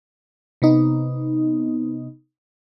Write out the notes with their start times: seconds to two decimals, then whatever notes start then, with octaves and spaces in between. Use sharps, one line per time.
0.62 C3 B3 D#4